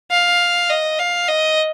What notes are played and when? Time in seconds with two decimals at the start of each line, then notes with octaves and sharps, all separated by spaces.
0.11 F5
0.70 D#5
0.99 F5
1.28 D#5